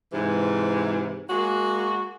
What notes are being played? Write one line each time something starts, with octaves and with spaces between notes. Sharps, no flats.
G#2 C3 E3
G#3 A#3 F#4